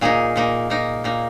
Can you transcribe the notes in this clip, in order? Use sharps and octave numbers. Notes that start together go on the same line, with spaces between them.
A#2 A#3 D#4 G#4
A#2 A#3 D#4
A#2 A#3 D#4
A#2 A#3 D#4